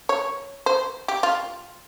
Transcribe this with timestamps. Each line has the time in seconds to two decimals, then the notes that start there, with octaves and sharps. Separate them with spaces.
0.09 C#5
0.66 C5
1.08 G4
1.23 F4